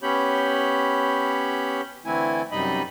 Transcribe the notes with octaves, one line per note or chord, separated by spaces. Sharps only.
B3 C#4 G4 C#5 B5 G6
D3 E3 A3 C4 E4 G#5
F#2 C3 G3 D#4 D#5 B5